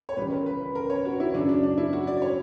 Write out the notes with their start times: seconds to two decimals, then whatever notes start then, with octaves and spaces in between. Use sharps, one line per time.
0.09 C#5
0.17 C#2 C#3 E3 G3 B4
0.31 A#4
0.46 B4
0.61 B4
0.75 A#4
0.90 C#5
1.05 F#4
1.20 E4
1.34 F#2 C#3 F#3 D4
1.49 D4
1.63 D4
1.78 E4
1.93 F#4
2.07 D5
2.22 C#5